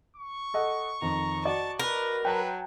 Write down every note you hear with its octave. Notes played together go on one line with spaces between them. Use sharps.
C#6
A4 D#5 F#5
F2 D#3 A#5
F#4 D5 D#5 A5
A#4 B4
F#3 B4 G5 A5 A#5